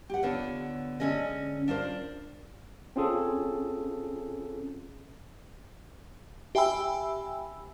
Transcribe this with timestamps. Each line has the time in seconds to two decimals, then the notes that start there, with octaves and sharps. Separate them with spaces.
0.10 G4 F#5
0.23 D3 B3 F4 B4 C#5
1.00 D3 G#3 C#4 G#4 D#5
1.68 D4 F4 A#4 C5
2.96 C4 C#4 F4 G#4 A4
6.55 G4 E5 G5 G#5 B5 E6